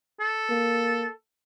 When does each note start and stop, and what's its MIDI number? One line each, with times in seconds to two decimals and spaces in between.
0.20 1.11 69
0.50 1.06 58